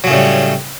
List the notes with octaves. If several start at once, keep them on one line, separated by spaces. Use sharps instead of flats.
A2 C#3 F#3 G3